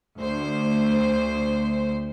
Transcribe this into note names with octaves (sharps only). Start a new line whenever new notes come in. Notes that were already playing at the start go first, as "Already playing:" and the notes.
D2 C5